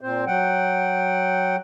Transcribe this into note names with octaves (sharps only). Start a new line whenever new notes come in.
A#2 C4 C5
F#3 F#5 G5